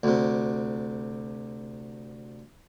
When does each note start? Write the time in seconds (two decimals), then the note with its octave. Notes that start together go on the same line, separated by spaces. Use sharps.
0.03 D2 C3